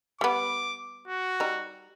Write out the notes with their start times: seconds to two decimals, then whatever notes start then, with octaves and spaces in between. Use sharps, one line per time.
0.21 G3 B3 D6
1.08 F#4
1.40 G3 D#4